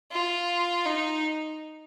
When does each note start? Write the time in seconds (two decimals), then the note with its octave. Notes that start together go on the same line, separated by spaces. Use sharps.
0.11 F4
0.86 D#4